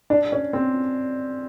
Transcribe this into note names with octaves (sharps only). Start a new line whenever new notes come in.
D4
C#4
C4